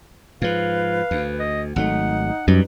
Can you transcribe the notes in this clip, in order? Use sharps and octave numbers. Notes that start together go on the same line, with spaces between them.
G#2 F3 B4 F5
D2
D#5
G#1 F#3 A3 D#4 F#5
F#2 G3 B4